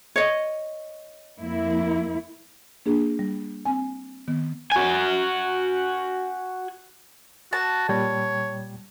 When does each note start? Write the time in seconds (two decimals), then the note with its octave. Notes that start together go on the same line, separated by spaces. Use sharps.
0.16 C#5 D#5
1.38 F2 A#3 E4
2.86 A#3 D4 G#4
3.19 G3
3.65 C4 G#5
4.28 D#3 B3
4.72 F#4 G#5
7.53 F#4 A5
7.89 A#2 G3 C#5 G5